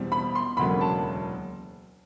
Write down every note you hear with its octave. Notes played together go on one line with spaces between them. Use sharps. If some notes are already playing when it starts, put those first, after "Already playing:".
Already playing: E2 B2 G3 C4
B5
C6
E1 D2 C#3 F#3 A#3 B5
A5